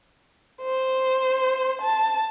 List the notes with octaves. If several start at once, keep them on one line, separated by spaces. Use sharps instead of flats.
C5
A5